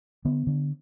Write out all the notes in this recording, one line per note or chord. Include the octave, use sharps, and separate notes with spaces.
D3 B3
D3